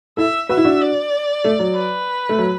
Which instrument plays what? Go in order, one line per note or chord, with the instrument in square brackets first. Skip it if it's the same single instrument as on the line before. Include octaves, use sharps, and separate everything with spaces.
[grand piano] E4 A4 [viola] E5
[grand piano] F#4 B4 [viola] E5
[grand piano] E4
D4 F#4
[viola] D5
[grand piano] A3
F#3
[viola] B4
[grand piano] A3
F#3